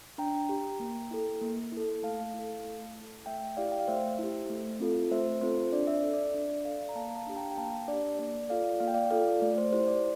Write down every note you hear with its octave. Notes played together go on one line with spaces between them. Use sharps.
D4 G5 A#5
G4
A#3
E4 A4
A#3
E4
A4
A3 F5 A5
E4
A4
A3
E4 A4
A3 E5 G5
E4 G4 D5 F5
G5
F5
A3 C5 E5
E4 G4
A3
C4 F4 A4
A3 C5 E5
C4 F4 A4 C5
D4 D5
E5
D5
A4
D5
D4 D5
A4 D5 F5
A#5
A#3 F5 A5
F5 A5
D4 G4
G5 A#5
G5
A#3 F5 A5
D4 G4 D5
A#3 D5
F4 A4 D5 F5
A#3 F5
G5
D5 F5
F4 A4 D5 F5
A3 D5
C5
E4 G4 C5
D5